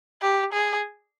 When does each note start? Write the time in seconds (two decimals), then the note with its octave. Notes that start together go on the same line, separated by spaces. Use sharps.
0.22 G4
0.53 G#4